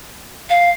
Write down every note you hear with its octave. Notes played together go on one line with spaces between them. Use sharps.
F5